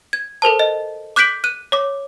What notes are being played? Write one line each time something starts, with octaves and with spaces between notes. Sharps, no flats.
G#6
A4 A#4 C5 A5
D#5
D6 F#6 G6 B6 D7 F#7
F#6 D#7
C#5 D6